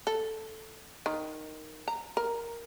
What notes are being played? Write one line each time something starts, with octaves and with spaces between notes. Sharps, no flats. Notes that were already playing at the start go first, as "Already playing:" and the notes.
A4
D#3
A#5
A#4